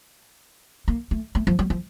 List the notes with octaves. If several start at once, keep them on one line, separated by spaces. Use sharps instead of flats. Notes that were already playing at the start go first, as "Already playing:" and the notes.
A#3
A3
A3
F3
G3
F3